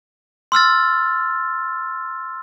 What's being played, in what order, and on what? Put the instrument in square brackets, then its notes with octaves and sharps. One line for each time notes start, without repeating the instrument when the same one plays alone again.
[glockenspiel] C6 E6 F6 A6